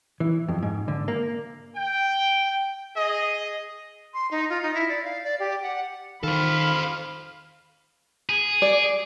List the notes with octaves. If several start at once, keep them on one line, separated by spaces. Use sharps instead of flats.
E3
F2
G#2
D3
A#3
G5
G#4 D#5
C6
D#4
F4
D#4
E4
D5
F5
D5
G4
F#5
D#3 A4 C5 F5 B5
G#4
D5